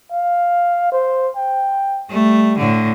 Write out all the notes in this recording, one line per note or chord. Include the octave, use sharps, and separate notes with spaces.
F5
C5
G5
G3 A3
A2 D3